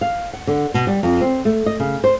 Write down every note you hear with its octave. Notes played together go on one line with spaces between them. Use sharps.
F5
F#5
D3
B2
G3
F2
C4
A3
D#5
C#3
C5